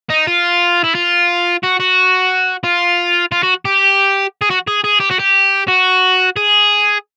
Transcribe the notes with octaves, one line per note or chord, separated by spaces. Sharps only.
D#4
F4
E4
F4
F#4
F#4
F4
F4
F#4
G4
G#4
F#4
G#4
G#4
G4
F#4
G4
F#4
G#4